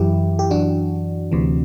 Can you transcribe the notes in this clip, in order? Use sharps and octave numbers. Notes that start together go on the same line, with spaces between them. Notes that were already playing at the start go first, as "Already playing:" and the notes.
Already playing: F#2 E3 E4 G4
G4
F#2 E3 D4 F#4
D2 C3 E3